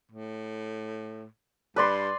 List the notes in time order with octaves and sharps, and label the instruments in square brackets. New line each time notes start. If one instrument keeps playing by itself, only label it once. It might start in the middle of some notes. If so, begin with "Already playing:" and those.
[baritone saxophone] A2
[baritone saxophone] G2 [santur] B4 D5 C6